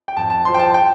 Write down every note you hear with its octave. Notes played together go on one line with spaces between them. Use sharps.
G5
F2 A5
A5
F3 C4 C6
G5
A5
G5